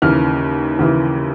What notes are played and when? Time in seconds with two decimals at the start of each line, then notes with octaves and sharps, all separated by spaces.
0.02 D#2 C#3 E3 F6
0.79 D#2 C#3 E3